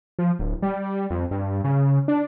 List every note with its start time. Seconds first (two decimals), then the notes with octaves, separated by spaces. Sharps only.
0.19 F3
0.39 D1
0.62 G3
1.10 F2
1.31 G2
1.64 C#3
2.08 D4